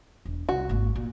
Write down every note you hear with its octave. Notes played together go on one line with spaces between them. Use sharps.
E1
C2 F#4
G#1 A#3
A#2